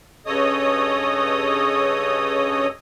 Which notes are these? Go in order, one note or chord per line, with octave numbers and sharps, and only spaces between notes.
G2 C#3 A4 C#5 D#5 D#6